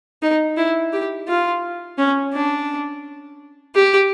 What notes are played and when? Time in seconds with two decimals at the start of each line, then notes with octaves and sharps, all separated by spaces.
0.22 D#4
0.57 E4
0.93 G4
1.28 F4
1.98 C#4
2.33 D4
3.75 G4